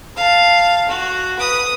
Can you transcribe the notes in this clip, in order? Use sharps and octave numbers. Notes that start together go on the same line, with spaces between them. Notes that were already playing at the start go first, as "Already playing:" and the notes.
F5 A5
F#4
B4 D#6